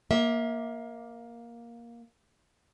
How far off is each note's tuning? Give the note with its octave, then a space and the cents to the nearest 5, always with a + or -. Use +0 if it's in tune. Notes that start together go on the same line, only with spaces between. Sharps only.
A#3 +10 E5 -25